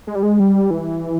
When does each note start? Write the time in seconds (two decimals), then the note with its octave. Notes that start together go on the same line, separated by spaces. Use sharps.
0.07 G#3
0.15 G3
0.23 G#3
0.40 G3
0.70 E3